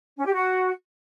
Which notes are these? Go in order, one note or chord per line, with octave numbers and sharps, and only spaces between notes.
C#4
G4
F#4